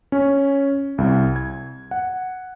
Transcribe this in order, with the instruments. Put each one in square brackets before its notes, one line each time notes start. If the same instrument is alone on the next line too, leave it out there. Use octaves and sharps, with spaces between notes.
[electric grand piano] C#4
C2
G#6
F#5